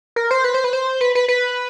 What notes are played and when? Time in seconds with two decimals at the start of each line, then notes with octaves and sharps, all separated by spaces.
0.16 A#4
0.31 C5
0.44 B4
0.54 C5
0.64 B4
0.73 C5
1.01 B4
1.15 B4
1.28 B4